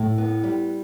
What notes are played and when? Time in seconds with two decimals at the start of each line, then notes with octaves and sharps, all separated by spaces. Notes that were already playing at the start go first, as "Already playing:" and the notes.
Already playing: A2
0.18 B3
0.44 G3